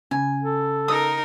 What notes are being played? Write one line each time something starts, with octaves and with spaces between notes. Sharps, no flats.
C#3 G#5
A4
D#4 A#4 D#6